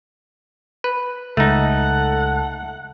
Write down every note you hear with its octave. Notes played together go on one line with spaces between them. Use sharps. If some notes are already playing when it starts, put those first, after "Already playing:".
B4
C#2 A3 D#4 A4 F#5